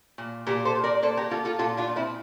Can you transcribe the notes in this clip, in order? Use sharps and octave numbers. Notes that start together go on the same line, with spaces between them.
A#2
A#2 G4 A#4
A4 C5
A#2
A#4 D5
A#3 A4 C5
G4 A#4
A#3 F4 A4
F4 A4
A#2 F4 A4
D4 F4
A#2
C4 E4